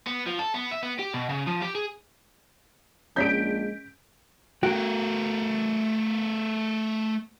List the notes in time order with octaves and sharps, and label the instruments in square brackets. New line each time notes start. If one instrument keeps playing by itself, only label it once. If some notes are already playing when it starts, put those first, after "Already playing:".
[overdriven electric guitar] B3
F3
A4
B3
E5
B3
G4
B2
C#3
F3
G4
G#4
[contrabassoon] A#1 [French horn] G#3 [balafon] C#4 C#5 D5 [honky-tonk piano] G6 B6 D7
[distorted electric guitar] A3 A#4 [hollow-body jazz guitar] F#4 G5